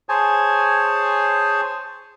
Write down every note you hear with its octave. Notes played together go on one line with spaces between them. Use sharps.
G#4 C5 C#5 G#5 A5